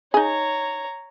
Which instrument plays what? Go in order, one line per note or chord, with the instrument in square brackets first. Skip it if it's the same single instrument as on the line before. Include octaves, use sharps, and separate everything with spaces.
[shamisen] D#4 G#4 [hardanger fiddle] C#5 A#5